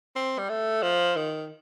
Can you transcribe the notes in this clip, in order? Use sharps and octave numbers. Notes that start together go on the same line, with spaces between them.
C4
G3
A3
F3
D#3